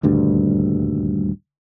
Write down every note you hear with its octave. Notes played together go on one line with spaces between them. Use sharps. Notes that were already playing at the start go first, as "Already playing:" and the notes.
D#1 D2 G2